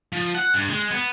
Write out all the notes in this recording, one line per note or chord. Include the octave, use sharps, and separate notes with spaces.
F3
F#5
G2
G#3
B3